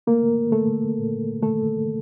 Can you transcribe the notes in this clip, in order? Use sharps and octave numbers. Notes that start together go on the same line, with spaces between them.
A3 A#3 A#4
A3 A4
A#2
A3 A4